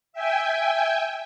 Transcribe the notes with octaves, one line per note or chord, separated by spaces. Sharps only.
E5 G5 G#5